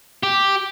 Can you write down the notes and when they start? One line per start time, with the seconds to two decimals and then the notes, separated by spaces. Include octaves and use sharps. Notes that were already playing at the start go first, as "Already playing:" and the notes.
0.23 G4